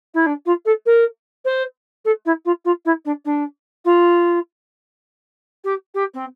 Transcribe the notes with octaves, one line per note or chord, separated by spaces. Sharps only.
E4
D4
F4
A4
A#4
C5
A4
E4
F4
F4
E4
D4
D4
F4
G4
G4
C4